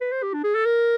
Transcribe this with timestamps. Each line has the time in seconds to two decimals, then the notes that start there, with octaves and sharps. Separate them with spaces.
0.01 B4
0.12 C5
0.23 G4
0.34 D4
0.44 G#4
0.55 A4
0.65 A#4